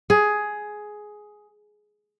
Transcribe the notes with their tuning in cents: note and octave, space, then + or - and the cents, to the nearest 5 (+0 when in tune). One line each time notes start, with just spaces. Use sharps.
G#4 +10